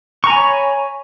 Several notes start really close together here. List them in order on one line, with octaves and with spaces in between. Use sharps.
C#6 A#5 G#5 B5 C#5